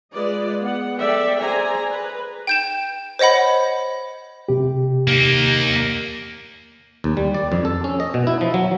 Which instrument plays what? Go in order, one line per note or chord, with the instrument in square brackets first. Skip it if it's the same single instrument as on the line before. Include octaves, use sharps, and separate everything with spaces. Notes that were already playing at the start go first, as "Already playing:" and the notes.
[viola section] G#3 F4 B4 D5 D#5
B3 F#5
A4 D5 E5 G5
G#4 C5 D5 G#5 A#5
B4
[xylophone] G5 G6 E7
C5 C#5 D#5 F#5 B5
[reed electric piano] C3 G4
[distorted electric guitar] A#3 D#4
[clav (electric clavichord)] D#2
G3
D5
F2
A4
C#4
D#5
B2
E4
F3
F#3